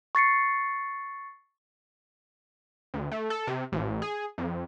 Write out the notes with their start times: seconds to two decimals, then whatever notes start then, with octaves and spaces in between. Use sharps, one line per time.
0.15 C#6 A6 C7 C#7
2.94 D2
3.11 A3
3.30 A4
3.47 C3
3.72 A1
4.02 G#4
4.38 F2